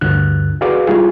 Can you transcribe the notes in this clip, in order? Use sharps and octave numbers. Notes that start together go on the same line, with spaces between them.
D2 G2 D3 F#6
F#4 G#4 B4 D5 F5 D6
G3 E4 F4 G#4